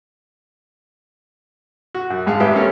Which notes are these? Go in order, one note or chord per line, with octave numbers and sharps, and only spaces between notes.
F#4
F#2
G#2 G#3 F5 A5
G#1 G4 B4 E5
A#3 C#4 A4 C#5